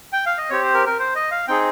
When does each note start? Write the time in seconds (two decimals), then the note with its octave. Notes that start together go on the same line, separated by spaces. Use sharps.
0.13 G5
0.26 F5
0.38 D#5
0.50 C4 G4 C#5
0.63 C5
0.74 A#4
0.86 A#4
0.99 C5
1.15 D#5
1.31 F5
1.48 C4 D#4 G#4 G5